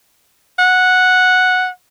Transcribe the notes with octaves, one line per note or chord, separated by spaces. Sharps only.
F#5